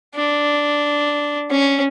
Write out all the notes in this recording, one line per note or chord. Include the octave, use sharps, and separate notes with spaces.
D4
C#4